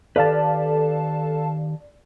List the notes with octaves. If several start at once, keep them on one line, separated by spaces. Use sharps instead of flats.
D#3 G4 A4 B4 D5 F5 A5